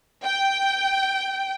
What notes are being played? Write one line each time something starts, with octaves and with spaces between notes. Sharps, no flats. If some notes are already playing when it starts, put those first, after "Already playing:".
G5